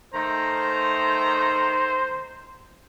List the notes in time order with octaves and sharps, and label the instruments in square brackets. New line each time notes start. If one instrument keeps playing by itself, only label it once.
[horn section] D#3 A3 A#5 [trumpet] C5